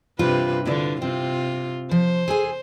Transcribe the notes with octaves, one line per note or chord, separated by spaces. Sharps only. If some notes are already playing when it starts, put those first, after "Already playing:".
G2 C3 C4 F4 B4
D3 E4 F4 B4 D5
C3 C4 F4
F3 C5
G#4 A4 G#5